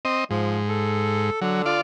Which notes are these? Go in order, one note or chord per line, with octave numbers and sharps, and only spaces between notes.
C4 D#5
G#2 F3
A4
D3 F#3
F4 D5